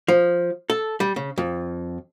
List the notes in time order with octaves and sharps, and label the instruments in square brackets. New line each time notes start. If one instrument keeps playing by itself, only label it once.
[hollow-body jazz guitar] F3
A4
G3
C#3
F2